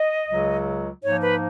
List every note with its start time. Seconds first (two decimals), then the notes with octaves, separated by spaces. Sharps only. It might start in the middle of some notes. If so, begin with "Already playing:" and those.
Already playing: D#5
0.27 C#2 C#3 F#3
1.04 G#2 F3 A#3 D#4 C#5
1.22 B4